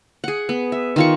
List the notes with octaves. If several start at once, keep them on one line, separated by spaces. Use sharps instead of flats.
G#4 F#5
B3
E5
D#3 F4 C#6